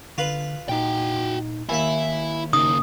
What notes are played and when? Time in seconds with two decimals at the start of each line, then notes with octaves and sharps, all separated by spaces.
0.18 D3 F4 B4
0.69 A#2 D#4 F#4 G5
1.69 D#2 E4 E5 G#5
2.53 C#3 A#3 D#4 D#6